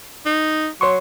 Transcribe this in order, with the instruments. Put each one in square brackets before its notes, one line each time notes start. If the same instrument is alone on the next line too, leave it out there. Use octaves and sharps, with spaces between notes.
[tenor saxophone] D#4
[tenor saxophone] F#3 [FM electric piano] C#5 C6 C#6